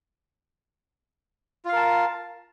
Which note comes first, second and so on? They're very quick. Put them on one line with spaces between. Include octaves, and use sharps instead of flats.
F4 F5 A#4 A5